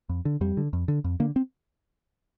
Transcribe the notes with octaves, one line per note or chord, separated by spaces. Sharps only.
F2
D3
F2 G3
D3
F2
D3
F2
D3 A#3
C4